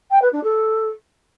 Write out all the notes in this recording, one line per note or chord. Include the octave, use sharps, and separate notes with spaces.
G5
B4
D4
A4